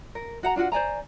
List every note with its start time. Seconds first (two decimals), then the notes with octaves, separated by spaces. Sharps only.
0.15 A#4
0.43 F#4 F#5 A#5
0.56 D4 F4 F#4 F#5
0.72 C5 D5 G#5 A#5